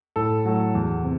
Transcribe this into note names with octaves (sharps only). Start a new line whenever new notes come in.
A2 A4
F#3 A3
E2
C3